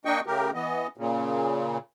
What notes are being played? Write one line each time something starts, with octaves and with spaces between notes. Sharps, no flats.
A#3 D4 D#5 G5 C#6
C#3 A3 G4 A#4
E3 B3 D#5
A#2 C#3